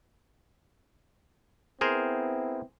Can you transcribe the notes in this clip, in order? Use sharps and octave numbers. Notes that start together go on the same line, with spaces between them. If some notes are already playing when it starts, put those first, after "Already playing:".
B3 C4 E4 G#4 A#4 C5